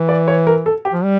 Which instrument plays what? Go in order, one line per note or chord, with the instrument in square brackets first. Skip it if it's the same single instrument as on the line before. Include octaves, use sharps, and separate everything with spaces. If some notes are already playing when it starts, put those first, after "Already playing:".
Already playing: [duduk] E3
[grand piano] D5
C#5
A#4
A4
G4
[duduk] F3
G3